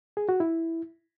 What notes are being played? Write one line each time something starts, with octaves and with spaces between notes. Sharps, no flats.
G#4
F#4
E4